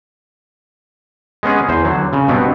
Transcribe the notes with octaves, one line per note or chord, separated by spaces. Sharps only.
G#3 B3 C#4 G#4
E2 C5
D3 F#3
C#3
G2 B2 B3 C4